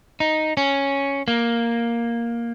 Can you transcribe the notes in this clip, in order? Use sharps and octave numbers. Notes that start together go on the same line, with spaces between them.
D#4
C#4
A#3